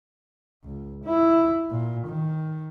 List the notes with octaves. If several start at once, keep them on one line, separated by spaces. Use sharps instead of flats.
C#2
E4
A#2
D#3